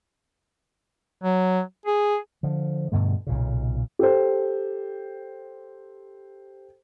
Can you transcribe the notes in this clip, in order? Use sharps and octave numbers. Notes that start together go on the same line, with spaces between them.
F#3
G#4
D3 F3
G2 B2 D3 A3
B1 A#2 C#3
G4 A4 C5